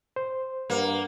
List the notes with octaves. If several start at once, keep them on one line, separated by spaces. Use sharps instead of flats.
C5
G2 A#3 B4 F#5